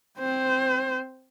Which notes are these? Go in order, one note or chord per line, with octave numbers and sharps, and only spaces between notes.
C4 C5